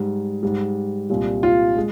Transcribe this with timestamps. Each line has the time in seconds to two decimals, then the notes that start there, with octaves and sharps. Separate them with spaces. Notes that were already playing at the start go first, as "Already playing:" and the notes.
Already playing: G#2 G3
0.43 G#2 G3
1.10 C2 A#2 G3
1.43 F4
1.77 G#3